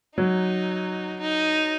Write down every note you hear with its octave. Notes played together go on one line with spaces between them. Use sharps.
F#3 D#4
D#4